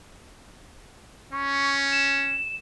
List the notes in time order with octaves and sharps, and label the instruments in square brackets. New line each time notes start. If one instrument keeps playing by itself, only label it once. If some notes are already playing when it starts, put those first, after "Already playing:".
[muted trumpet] C#4 [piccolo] C#6
[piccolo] E7